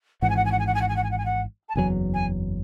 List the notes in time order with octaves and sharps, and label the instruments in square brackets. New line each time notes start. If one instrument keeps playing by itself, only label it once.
[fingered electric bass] G#1 G#2 E3 [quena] F#5
[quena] G#5
F#5
G#5
F#5
G#5
F#5
G#5
F#5
G#5
F#5
G#5
F#5
G#5
F#5
A5
[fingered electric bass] F#1 E2 C#3 F#3 [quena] G#5
[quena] G#5